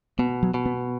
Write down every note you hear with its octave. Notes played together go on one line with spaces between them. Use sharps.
B2 B3
F#3
B2
B3